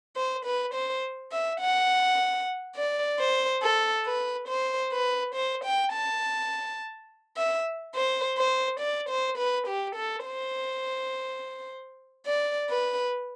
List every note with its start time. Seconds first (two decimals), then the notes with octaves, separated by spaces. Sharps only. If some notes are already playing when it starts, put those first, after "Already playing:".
0.16 C5
0.45 B4
0.74 C5
1.32 E5
1.61 F#5
2.76 D5
3.19 C5
3.62 A4
4.06 B4
4.48 C5
4.93 B4
5.35 C5
5.64 G5
5.93 A5
7.37 E5
7.95 C5
8.38 C5
8.80 D5
9.09 C5
9.38 B4
9.67 G4
9.96 A4
10.25 C5
12.26 D5
12.69 B4